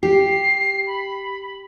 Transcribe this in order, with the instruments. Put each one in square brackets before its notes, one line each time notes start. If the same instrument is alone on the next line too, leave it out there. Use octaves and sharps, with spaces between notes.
[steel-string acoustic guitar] G4 [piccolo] C7
[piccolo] B5